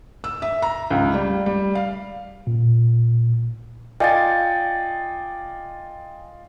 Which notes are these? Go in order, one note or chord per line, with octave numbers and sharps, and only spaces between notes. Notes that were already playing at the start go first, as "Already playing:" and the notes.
E6
E5
A#5
C#2
G3
G3
F5
A#2
F4 D5 D#5 G5 G#5 A6